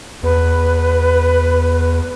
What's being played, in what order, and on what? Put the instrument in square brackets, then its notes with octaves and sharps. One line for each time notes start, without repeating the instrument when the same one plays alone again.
[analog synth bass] E2 [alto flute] B4